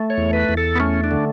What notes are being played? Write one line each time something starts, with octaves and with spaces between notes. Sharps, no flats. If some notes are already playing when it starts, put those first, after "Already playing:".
Already playing: A3
C#5
E2
B4
E2
A4
B3
A3 C#4
D4
D3